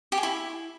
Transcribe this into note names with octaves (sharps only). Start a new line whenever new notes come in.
G4
G#4
E4